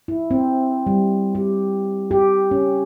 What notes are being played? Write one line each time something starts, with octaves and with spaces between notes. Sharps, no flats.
E4
C4
G3
G4
G4
C#4